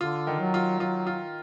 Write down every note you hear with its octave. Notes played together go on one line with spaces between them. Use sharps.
D3 F4
D#3
F#3
F4
F#3 F4
F4